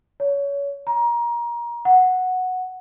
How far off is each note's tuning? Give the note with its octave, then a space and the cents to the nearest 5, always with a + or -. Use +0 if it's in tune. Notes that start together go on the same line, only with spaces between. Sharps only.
C#5 +25
A#5 +25
F#5 -5